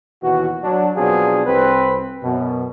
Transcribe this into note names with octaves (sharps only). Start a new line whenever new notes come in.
D#2 B2 E3 F#4
F#3 D4
B2 F3 F#3 C4 D4 G#4
C2 C4 B4
F#2 B2